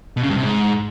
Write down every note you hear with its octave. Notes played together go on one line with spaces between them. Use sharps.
B2
C#3
G2
C3
G#2